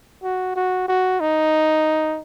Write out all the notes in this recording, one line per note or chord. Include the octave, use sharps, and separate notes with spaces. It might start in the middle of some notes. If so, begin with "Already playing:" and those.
F#4
F#4
F#4
D#4